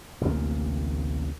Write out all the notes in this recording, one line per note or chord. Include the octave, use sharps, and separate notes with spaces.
A1 D2 C3 A#3